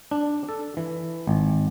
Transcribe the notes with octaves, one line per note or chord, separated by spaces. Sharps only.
D4
A4
E3
G#1